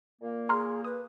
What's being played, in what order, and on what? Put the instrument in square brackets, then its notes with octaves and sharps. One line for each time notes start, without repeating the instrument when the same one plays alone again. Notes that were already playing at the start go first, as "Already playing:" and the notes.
[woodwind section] A#2 A#3
[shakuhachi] G#4 [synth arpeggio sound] A#5 C6 F6
[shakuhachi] B4 [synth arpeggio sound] D#6